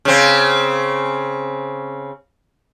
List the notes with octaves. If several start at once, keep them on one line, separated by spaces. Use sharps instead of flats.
C#3 C4